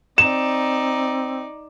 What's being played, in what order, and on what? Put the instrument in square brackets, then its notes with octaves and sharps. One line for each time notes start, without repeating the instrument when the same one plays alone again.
[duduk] C4 [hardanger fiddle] D#4 D5 [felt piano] E7